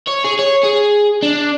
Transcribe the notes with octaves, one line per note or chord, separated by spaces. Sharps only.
C#5
G#4
C#5
G#4
D4